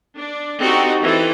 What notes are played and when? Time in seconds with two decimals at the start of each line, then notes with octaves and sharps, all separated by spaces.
0.16 D4
0.60 C4 D#4 F#4 G4 A4
1.02 E3 C4 A4